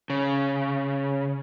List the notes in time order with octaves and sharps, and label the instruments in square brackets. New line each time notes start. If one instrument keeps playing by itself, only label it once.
[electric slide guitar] C#3